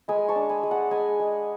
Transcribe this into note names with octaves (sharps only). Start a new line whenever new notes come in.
G#3 G#5 B5
A5 C#6
D4
G#5 B5
G#3
F#5 A5
G#3 G#5 B5
G#3